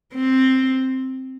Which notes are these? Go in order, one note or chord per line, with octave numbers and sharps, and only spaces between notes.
C4